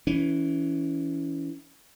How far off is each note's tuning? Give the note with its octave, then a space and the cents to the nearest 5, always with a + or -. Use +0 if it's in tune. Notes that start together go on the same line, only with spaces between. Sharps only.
E3 +0 C#4 +20